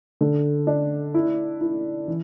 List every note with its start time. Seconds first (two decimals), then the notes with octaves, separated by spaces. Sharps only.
0.21 D3
0.67 D4
1.14 E4
1.61 E4
2.08 E3